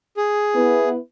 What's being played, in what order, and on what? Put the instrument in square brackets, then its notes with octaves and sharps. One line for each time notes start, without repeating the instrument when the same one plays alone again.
[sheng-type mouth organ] G#4
[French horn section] B3 E4 B4